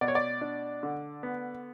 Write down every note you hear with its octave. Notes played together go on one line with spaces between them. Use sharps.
B2 D5
C#5
D5
D4
D3
B3